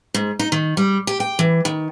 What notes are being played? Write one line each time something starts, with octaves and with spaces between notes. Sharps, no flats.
G#2
D#4
D#3
G3
G4
G5
E3
D#3